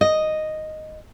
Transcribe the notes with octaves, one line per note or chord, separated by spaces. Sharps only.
D#5